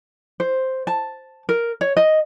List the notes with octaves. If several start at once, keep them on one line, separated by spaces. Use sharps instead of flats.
C5
A5
A#4
C#5
D#5